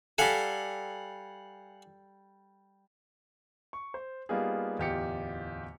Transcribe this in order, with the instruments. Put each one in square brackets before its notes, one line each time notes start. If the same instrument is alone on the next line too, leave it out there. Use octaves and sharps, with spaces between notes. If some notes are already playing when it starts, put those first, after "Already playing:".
[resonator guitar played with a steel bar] G3 A4 [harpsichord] F5 F#5 G#5
[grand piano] C#6
C5
G3 A#3 B3 D#4 F4 G#4
D1 E2 F4 G4 D#5 C#7